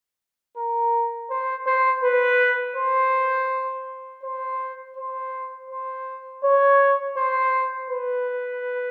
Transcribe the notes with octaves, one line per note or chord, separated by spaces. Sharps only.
A#4
C5
C5
B4
C5
C5
C5
C5
C#5
C5
B4